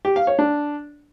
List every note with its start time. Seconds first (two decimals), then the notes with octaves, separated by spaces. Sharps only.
0.05 G4
0.16 F5
0.27 C#5
0.39 D4